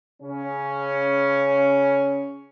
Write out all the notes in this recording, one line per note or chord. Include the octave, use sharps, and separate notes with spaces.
C#3 C#4